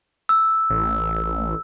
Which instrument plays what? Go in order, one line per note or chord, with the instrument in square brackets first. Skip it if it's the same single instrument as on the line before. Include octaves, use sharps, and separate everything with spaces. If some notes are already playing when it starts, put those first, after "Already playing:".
[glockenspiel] E6
[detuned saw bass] A1